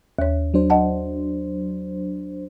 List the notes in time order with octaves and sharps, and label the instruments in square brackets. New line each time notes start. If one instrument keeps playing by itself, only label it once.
[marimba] D#2 C#5
[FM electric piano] F#3 D4 C5
[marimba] D#5 F#5 A5